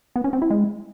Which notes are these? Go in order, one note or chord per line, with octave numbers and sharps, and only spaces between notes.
B3
C#4
C4
E4
G#3